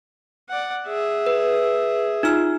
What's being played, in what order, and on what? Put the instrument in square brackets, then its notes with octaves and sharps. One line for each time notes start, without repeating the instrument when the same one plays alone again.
[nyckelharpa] D5 F#5
G#4 E5
[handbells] B4
D#4 F4 F6